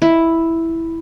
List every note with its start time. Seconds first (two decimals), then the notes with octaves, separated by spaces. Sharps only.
0.02 E4